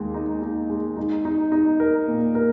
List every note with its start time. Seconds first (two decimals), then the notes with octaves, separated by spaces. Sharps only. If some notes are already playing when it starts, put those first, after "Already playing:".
Already playing: D#2 G#3 D#4
0.14 D#4
0.42 D#4
0.70 G#3
0.97 D#4
1.25 D#4
1.52 D#4
1.80 A#4
2.07 A#2
2.35 A#4